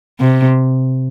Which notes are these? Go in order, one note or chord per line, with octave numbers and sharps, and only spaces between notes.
C3